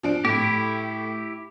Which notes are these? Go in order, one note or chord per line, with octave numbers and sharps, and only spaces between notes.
F3 D4 D7
A2 E4 G4